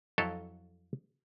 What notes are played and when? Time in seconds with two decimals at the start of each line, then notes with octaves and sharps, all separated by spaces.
0.18 F2 F#3 E4 A4 D#5 F5